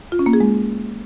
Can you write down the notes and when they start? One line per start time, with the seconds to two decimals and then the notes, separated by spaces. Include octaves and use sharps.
0.12 F4
0.19 C#4
0.26 A#3
0.33 G#4
0.40 G#3